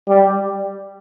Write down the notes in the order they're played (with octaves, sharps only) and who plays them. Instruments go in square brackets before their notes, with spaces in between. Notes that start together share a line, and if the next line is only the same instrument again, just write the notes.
[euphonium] G3